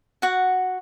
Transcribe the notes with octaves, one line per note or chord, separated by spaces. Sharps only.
F#4 F#5